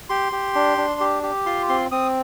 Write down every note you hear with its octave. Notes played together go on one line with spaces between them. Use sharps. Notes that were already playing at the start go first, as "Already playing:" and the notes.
G4 C6
G4
D4
D4
G4
G4
F4 C6
C4 C6
C4 D#6